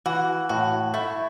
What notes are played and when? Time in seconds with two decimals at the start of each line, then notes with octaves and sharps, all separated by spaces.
0.06 E3 F#4
0.49 A2 F#4
0.94 A3 E4